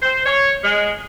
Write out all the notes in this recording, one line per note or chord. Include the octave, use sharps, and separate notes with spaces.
C5
C#5
G#3